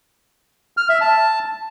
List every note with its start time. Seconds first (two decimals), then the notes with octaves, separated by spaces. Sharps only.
0.77 F6
0.89 E5
1.01 A5